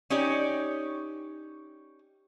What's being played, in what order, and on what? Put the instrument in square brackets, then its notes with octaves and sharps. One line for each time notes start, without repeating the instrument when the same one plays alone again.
[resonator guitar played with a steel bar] C#4 D#4 G4 C#5 D5